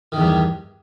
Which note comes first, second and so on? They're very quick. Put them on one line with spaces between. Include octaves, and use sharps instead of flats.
D#3 E2 G2